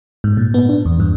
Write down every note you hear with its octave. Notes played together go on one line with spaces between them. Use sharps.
G#2
A#2
B3
D4
E2
G2